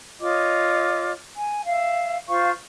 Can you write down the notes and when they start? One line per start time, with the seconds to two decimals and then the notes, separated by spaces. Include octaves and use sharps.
0.21 F4 C#5 D#5 D6
1.35 G#5
1.66 E5 F5
2.28 F4 C5 F5 C#6